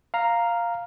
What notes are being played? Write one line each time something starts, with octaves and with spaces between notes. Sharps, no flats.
F5 A#5